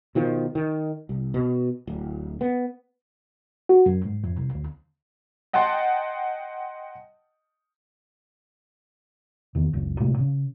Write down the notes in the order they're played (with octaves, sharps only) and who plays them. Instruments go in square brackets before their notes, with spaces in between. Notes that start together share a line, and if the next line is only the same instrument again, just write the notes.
[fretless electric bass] B2 D#3 F3
D#3
C2
B2
D1
B3
[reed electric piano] F#4
F#2
G#2
F2
C2
D2
[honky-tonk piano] D#5 F#5 G5 A5 C6
[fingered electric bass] E2 D#3
F#1 C#2
A1 A2 C3 G#3
C#3